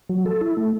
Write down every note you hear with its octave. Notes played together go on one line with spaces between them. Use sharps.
F#3
A4
E4
A3